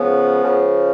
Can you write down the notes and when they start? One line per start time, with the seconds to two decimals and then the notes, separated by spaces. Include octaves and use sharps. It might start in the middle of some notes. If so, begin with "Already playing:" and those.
Already playing: C#2 C#3 F3 B3
0.42 C#2 C#3 F3